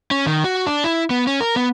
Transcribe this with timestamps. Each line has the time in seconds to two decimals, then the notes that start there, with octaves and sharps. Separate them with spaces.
0.11 C#4
0.26 D#3
0.44 F#4
0.67 D4
0.84 E4
1.10 B3
1.27 C#4
1.41 A#4
1.56 B3